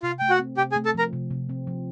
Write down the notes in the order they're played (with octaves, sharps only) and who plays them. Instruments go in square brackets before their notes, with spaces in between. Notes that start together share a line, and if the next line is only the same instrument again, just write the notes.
[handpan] C3 [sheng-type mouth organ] F4 F5
[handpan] A3 [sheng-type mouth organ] G5
[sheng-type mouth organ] F#4 F#5
[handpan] C4
[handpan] C3 [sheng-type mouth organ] G4 G5
[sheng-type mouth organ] G#4 G#5
[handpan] A3
[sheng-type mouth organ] A4 A5
[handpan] F3 [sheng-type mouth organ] A#4 A#5
[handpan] C3
C3
C4
F3